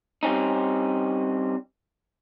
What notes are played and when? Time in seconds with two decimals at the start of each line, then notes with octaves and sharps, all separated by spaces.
0.23 G3 C4 C#4 D#4